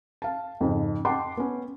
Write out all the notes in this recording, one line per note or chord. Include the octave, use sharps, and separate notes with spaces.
F5 A5
F2 G#2 C#3
D#5 F#5 G5 A5 C6 D6
B3 C#4